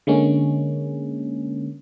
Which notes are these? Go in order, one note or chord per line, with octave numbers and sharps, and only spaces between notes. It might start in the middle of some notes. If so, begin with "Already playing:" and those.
D3 G#3 A#3 C#4